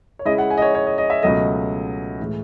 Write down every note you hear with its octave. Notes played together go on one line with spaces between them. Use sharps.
C#5
C#3 G#3 C#4 E4 D#5
F#5
G#5
D#5
C#5
C#5
D#5
D#5
E5
C#2 B2 F#3 A3 D#5
A2 E3 G#3